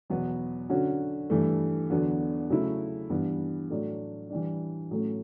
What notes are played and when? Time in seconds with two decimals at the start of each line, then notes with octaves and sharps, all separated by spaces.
0.10 E2 B2 F#3 B3
0.69 D3 F#3 C#4 F#4
1.30 G2 E3 A3
1.90 E2 D3 F#3 B3 F#4
2.50 C#3 F#3 A3 E4
3.10 G2 E3 B3
3.70 A2 F#3 A3 D4
4.30 E3 G3 D4
4.91 A2 F#3 A3 C#4